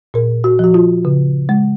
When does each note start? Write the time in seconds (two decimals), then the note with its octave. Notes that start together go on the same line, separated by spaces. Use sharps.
0.14 A#2 A#4
0.44 F#4
0.59 F3 F#4
0.74 F4
1.05 C#3
1.49 G#3